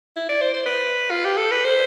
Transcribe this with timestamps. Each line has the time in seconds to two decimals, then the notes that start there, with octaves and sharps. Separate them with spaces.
0.16 E4
0.29 D5
0.41 C5
0.54 C5
0.66 B4
1.10 F4
1.25 G4
1.37 A4
1.51 B4
1.64 C5